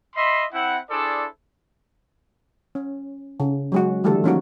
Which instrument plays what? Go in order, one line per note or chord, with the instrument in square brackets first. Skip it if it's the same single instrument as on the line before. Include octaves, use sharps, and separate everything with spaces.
[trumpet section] D#5 E5 B5 C6
C4 E4 F#5
D4 E4 G#4 A4 C5 D5
[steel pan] C#4
C#3
F#3 G#3 F#4
D3 E3 G3 A3 F#4 A4
F3 A#3 C#4 D#4 F4 F#4